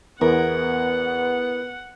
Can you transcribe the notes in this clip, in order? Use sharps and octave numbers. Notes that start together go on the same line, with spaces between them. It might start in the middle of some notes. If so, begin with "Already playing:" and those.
E2 B3 E4 A#4 F#5